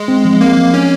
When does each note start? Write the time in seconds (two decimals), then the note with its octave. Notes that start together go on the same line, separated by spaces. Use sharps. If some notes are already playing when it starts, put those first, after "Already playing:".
Already playing: G#3
0.08 C4
0.25 F3
0.41 A#3 C4
0.57 F3
0.74 C#4